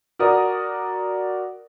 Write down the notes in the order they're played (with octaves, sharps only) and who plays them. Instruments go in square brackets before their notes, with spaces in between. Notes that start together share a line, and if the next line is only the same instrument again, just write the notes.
[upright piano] F#4 A#4 D5 D#6